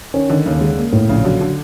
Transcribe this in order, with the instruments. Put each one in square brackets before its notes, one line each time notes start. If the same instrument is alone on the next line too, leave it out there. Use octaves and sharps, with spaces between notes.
[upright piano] D#3 [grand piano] C#4
[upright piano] D3 [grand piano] D#3
[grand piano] D#2 [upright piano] C#3
[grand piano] G#3
A#3
A2
[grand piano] A#1 [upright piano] C#3
[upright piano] D3 [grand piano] F#3
[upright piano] D3